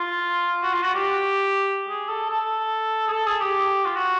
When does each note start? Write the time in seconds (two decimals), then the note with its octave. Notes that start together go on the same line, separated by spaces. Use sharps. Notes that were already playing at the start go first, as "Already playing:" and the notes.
Already playing: F4
0.62 F#4
0.73 F4
0.83 F#4
0.94 G4
1.88 G#4
2.09 A4
2.30 A4
3.07 G#4
3.12 A4
3.27 G#4
3.41 G4
3.85 F4
3.96 F#4